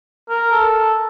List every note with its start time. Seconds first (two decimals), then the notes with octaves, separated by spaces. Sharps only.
0.29 A#4
0.52 A4